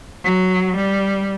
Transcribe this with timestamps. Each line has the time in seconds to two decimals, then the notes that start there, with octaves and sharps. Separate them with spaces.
0.24 F#3
0.77 G3